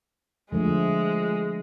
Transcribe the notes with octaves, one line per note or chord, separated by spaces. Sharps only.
D3 F3 G#3 A3